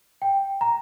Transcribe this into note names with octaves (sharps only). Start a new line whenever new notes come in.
G5
A#5